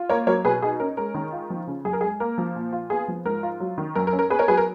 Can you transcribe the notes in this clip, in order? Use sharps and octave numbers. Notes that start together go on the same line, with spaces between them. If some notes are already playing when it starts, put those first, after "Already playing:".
Already playing: F4
A#3 A#4 C#5
F#3 A#4 C#5
B2 G#4 B4
D#4 G#4
C#4 A#4
G#3 A#4
D#3
F4
F3
C#3
F#2 G#4
A#4
G#3 G#4
A#3 A#4
F3
A#2
F4
B3 G#4
F3
G#2 A#4
F4
F#3
D#3
F#2 A#4
A#4
C#4
A#4
B3 G#4 B4
A#4 C#5
F#3 G#4 B4
A#4